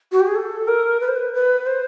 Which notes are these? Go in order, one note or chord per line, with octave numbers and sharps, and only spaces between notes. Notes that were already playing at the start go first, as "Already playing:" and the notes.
F#4
G4
G#4
A4
A#4
B4
C5
B4
B4
C5